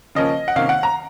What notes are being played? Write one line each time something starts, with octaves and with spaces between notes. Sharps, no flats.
C#3 F3 A#3 C#4 D#5
F#5
C3 D#3 A#3 C#4 F5
F#5
A#5